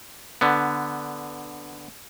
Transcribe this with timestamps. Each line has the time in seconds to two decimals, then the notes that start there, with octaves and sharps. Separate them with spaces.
0.41 D3 B3